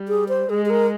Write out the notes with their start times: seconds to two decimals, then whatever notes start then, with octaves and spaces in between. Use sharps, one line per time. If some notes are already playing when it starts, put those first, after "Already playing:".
Already playing: G3
0.08 G#4
0.29 C5
0.49 G#3 G#4
0.66 G#4
0.70 A#4